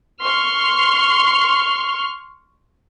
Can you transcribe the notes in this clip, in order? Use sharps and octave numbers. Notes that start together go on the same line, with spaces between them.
C6 C#6 F6